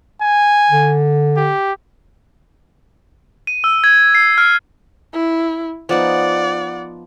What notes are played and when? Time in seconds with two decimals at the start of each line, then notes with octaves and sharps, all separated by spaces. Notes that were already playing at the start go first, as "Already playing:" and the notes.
0.22 G#5
0.71 D3
1.37 G4
3.47 D#7
3.64 E6
3.84 G#6
4.15 C7
4.38 F6
5.13 E4
5.89 F3 B3 D#4 D5 F#5